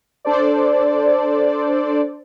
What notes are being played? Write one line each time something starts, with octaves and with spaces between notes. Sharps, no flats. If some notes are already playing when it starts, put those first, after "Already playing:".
D4 A4 C5 D5